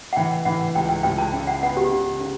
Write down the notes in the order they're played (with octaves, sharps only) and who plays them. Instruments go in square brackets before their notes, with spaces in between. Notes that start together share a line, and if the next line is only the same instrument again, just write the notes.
[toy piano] F#5
[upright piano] E3 [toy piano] G5
[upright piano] E3 [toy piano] F#5
[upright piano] C#2 [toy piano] G5
[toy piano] G5
[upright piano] C#2 [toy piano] G5
[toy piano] A5
[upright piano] C#3 [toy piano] G5
[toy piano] F#5
[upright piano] B3 [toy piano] F#5
[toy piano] G4
[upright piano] C#3
C#3